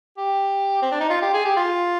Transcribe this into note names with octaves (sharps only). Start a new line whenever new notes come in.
G4
C4
D4
D#4
F4
G4
G#4
G4
F4